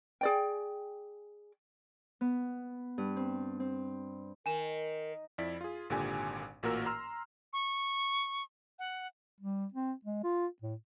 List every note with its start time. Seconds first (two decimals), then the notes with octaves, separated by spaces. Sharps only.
0.21 G#4 D5 G5
2.21 B3
2.98 G2
3.16 C4
3.60 C4
4.46 D#3 A#4 G#5 E7
5.38 F2 E4 D5 B6
5.61 F4 G#4
5.90 G#1 A#2 D3 G4 G#5
6.63 A1 A#2 A#3 F#4 A#4 E6
6.86 A#5 C6 E6 F6
7.53 C#6
8.79 F#5
9.41 G3
9.74 C4
10.05 G#3
10.24 F4
10.62 A2